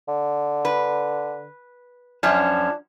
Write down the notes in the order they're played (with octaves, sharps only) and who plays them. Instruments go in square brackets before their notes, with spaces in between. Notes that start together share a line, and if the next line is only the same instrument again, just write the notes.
[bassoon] D3
[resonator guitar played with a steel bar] B4
[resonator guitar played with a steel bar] F#2 F3 C#4 [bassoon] D4